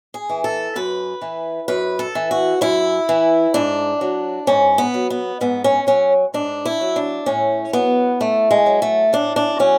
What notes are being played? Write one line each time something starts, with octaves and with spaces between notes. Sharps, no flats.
G#4
E3
A4
F#2 B4
E3
F#2 B4
A4
E3
F#4
F#2 E4
E3
G#2 D4
F#3
G#2 C#4
B3
F#3
B3
G#2 B3
C#4
F#3 C#4
G#2 D4
E4
F#3
D4
A2 C#4
F#3 B3
A2 A3
G#3
F#3
A3
A2 D4
D4
F#3 C#4